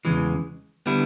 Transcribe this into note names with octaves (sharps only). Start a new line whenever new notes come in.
E2 C#3 E3 G#3
D3 G3 B3 E4